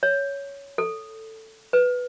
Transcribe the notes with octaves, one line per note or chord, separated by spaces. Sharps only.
C#5
A4
B4